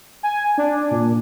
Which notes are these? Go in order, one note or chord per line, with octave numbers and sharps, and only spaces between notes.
G#5
D4
A#2